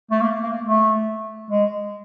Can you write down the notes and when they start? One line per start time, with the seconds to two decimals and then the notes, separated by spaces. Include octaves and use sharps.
0.11 A3
0.21 A#3
0.43 A#3
0.64 A3
1.51 G#3